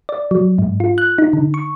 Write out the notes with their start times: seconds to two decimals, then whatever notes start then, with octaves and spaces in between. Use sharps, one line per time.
0.09 D5
0.31 F#3
0.58 G#2
0.80 F4
0.98 F#6
1.18 D#4
1.33 D3
1.54 C#6